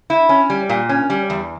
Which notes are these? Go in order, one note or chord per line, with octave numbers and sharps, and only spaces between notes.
E4
C#4
G3
A#2
C#4
G3
E2